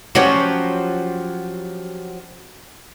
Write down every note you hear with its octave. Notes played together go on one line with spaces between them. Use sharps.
F3 F#3 C#4 F#4 G4